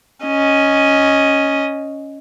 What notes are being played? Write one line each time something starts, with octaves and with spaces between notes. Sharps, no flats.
C#4 D#5